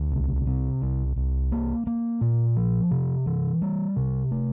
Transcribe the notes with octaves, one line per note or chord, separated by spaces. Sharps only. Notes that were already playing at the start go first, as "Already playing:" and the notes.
Already playing: D2
C2
C3
C2
C2
A#3
A#3
A#2
F3
C3
E3
G3
C3
A3